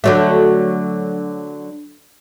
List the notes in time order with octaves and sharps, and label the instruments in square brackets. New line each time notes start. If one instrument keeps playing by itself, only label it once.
[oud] D3 F#3 A3